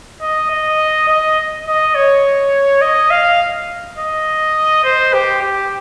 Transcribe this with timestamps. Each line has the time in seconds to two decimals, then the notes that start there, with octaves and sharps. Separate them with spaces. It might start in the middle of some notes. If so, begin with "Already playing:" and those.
0.21 D#5
0.50 D#5
1.08 D#5
1.67 D#5
1.95 C#5
2.81 D#5
3.11 F5
3.98 D#5
4.84 C5
5.13 G4
5.42 G4